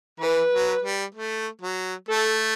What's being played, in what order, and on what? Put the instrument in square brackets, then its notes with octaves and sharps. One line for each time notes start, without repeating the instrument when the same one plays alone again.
[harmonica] E3 [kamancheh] B4
[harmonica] F#3
G3
A3
F#3
[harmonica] A3 [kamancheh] A4